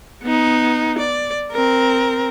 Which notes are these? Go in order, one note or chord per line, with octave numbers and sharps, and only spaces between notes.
B3 D#4
D5
C4 A#4